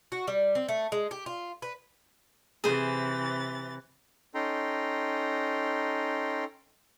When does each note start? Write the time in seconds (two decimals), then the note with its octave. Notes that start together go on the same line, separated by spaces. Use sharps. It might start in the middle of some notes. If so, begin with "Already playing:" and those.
0.12 F#4
0.28 G3
0.55 C4
0.68 A3
0.92 G#3
1.11 G4
1.26 F4
1.62 B4
2.64 C3 E3 G#4 C5 A6
4.35 C#4 D#4 A4 G5 A#5 C6